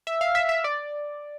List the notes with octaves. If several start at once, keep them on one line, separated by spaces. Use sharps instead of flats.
E5
F5
E5
E5
D5